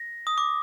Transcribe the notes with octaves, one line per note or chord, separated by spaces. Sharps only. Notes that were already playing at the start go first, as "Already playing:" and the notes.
Already playing: A#6
D#6
D6